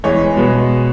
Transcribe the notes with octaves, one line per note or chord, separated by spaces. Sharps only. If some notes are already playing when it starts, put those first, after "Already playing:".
E2 E3 G#3 C#5
B2 G#3 B3